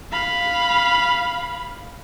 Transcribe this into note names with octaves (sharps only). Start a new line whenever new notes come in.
F5 B5